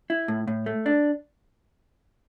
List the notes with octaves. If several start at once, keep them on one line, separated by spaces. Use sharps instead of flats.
E4
A2
A2
A3
D4